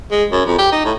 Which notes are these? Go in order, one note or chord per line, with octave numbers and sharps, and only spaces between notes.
G#3
F#2
F2
G4
D#4
A2